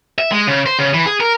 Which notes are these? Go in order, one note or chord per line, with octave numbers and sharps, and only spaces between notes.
E5
G#3
C#3
C5
C#3
E3
G#4
A#4